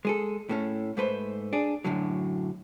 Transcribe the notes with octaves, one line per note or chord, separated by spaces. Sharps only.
G#3 G#4 A4
A2 A3 C#4
G#2 A3 B4 C5
D4 G#4
F#2 A2 D3 F#3